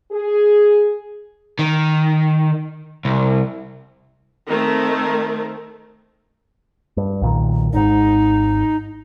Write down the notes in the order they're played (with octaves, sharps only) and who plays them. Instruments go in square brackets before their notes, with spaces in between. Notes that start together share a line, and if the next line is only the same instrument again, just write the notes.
[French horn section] G#4
[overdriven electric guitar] D#3
C2
[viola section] D#3 A3 C4
[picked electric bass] G2
B1 A#2 D#3
[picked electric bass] G#1 G#2 [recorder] D#4